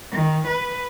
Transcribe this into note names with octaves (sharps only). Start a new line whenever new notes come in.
D#3
B4